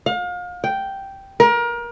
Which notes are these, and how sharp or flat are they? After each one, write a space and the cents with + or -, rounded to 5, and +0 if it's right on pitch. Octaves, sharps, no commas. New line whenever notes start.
F5 +35
G5 -5
A#4 +30